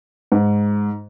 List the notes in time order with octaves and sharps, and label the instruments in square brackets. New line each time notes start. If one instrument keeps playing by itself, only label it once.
[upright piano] G#2